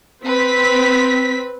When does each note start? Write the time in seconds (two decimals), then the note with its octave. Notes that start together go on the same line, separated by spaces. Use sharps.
0.25 C4 B4 B6